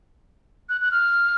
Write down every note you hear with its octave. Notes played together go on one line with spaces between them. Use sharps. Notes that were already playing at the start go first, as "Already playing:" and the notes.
F#6
F#6
F6